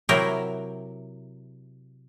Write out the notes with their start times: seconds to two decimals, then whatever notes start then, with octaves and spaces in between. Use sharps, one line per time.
0.09 C3 F#3 E4 A#4 G5